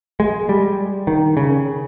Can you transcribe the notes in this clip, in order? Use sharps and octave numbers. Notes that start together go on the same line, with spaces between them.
G#3
G3
D#3
C#3